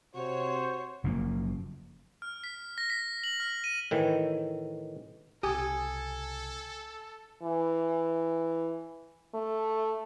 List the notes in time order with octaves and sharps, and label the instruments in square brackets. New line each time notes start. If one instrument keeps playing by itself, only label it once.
[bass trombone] C3 [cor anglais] F#4 [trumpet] C5 [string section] C#5
[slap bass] F#1 C#3 F3 A#3
[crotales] F6
B6
A#6
B6
F#7
F6
D#7
[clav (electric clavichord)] A2 D#3 E3
[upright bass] C2 C#3 [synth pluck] G4 D#6 [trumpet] A4 [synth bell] G#5 G#6
[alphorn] E3
A3